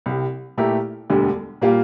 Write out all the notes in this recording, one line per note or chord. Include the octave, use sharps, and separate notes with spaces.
C2 C3 G3
A#2 A3 E4 G4 A#4
E1 D2 D3 G3
A#2 G3 A#3 F4